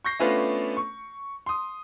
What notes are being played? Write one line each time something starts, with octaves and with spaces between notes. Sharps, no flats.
C#6 G6 A#6 C7
A3 B3 C#4 D4 F4 B4
C#6
C6 D#6